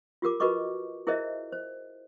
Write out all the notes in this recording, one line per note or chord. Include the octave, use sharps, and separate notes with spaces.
F4 G4 A#4 D6
F#4 A#4 B4 D#5 C#6 D6
E4 G#4 A#4 C5 D#5 E5
C5